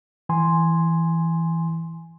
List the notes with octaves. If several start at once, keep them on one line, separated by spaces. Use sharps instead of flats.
E3 G#5 C6